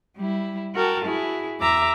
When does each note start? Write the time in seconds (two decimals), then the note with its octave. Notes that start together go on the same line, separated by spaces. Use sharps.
0.18 G3 E4
0.74 F#4 A#4 G5 A5
1.05 E4 F#4 G#4
1.60 E2 E5 A#5 D6